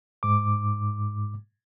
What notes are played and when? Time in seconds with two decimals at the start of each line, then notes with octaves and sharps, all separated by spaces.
0.23 G#2 D6